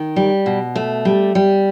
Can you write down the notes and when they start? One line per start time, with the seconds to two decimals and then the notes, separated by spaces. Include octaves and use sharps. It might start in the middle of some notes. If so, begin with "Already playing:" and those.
Already playing: D#3
0.16 G3
0.46 B2
0.76 A3
1.05 G3
1.35 G3